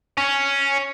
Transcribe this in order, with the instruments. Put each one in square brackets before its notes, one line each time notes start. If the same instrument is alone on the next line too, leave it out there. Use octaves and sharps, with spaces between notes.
[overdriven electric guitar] C#4